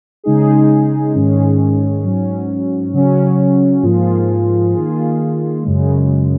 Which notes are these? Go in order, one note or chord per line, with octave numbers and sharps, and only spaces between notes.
C#3 G#3 D#4 G#4
G#2 D#3 G#3 C#4 G#4
G#2 F#3 C#4
C#3 F#3 C#4
G#2 F3 A#3 F4 G#4
D#3 A#3 F4 G#4
F#2 C#3 G#3